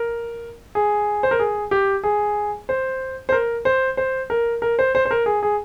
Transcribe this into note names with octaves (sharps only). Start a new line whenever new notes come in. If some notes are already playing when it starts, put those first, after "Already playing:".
Already playing: A#4
G#4
C5
A#4
G#4
G4
G#4
C5
C5
A#4
C5
C5
A#4
A#4
C5
C5
C5
A#4
G#4
G#4